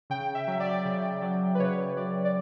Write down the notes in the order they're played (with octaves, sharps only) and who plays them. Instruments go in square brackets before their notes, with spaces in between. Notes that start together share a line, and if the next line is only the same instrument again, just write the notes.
[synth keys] C#3 G5
E5
F#3 E5
D5
C#3
F#3
B4
C#3 C#5
F#3 D5
D5